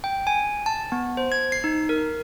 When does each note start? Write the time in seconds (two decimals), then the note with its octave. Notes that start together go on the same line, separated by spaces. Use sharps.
0.04 G5
0.27 G#5
0.66 A5
0.92 B3
1.17 C5
1.32 G#6
1.52 C7
1.64 D#4
1.89 A#4